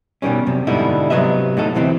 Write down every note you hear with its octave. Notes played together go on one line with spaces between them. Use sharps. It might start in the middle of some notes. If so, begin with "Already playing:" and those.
B2 D3 D#3 G3 C#4
F#2 C3
G#2 B2 D3 G3 D#4 E4
C3 F#3 B3 D#5 E5
A2 F#3 D#4 A4
D2 C3 E3 C4 E4